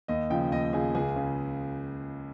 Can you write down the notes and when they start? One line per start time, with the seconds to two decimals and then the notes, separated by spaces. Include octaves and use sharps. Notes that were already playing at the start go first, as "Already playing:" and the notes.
0.08 D#2 D#5
0.30 C#3 F3 G5
0.52 D#2 D#5
0.73 C#3 F3 G#4
0.95 C#2 G#4
1.16 C#3